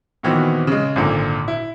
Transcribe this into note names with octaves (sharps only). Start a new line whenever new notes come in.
A#2 D#3 E3 B3 C4 F#4
C#3 G#3
G#1 A#2 D3
E4